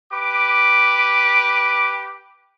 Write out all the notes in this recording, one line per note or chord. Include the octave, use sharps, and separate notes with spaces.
G4 B4 D6